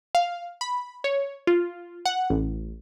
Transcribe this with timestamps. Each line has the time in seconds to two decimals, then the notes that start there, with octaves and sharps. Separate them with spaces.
0.15 F5
0.61 B5
1.04 C#5
1.47 F4
2.06 F#5
2.30 A1